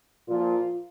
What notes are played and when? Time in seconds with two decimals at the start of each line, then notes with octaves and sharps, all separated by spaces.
0.27 A#2 F3 F4